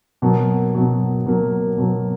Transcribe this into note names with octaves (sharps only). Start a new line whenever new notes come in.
B2 F#3 A#3
B2 F#3 A#3
B2 F#3 A#3
B2 F#3 A#3